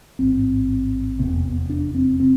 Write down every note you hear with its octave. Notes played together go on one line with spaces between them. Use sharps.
A1 G#2 C4
F1 E2 C3 B3
C4
B3
B3
D4
C4
C4